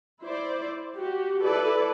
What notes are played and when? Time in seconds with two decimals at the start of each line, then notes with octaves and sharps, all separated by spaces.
0.22 E4 C5 D5
0.95 F#4 G4
1.44 E4 A4 B4 D5